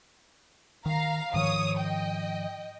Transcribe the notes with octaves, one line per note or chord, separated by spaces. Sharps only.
D#3 F5 A#5
G#2 D#3 F3 C#5 D#6
D#5 G5